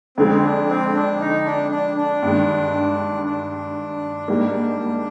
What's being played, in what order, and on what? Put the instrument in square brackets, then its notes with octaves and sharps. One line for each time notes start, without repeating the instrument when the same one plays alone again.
[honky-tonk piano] F2 D3 G#3 [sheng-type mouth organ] C4
[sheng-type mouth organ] D4
C4
D4
D#4
D4
D4
D4
[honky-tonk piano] G2 D#3 G#3
[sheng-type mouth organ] D4
[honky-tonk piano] G#2 G3 A#3